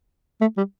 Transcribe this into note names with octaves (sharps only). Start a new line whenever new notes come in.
A3
G3